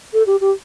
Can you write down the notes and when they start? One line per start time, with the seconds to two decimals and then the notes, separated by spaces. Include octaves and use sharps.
0.13 A4
0.27 G4
0.41 G4